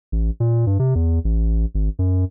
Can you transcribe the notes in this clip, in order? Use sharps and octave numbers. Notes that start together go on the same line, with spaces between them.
A1
A#2
G2
C3
E2
A1
G#1
F#2